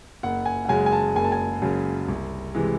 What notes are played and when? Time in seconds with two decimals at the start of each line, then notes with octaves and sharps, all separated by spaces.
0.23 F#1 F#5
0.45 G#5
0.65 F#5
0.69 F#2 C#3 G#3 G#5
0.86 G#5
0.92 A5
1.16 F#1 G#5
1.24 A5
1.32 G#5
1.62 F#2 C#3 G#3
2.08 C2
2.55 C3 E3 G#3